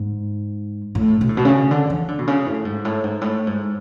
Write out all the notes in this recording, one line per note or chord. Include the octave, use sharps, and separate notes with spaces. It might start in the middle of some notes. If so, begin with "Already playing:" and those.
Already playing: G#2
A2
B2
A2
B2
C#3
D3
E3
D3
B2
C#3
A2
G#2
A2
G#2
A2
G#2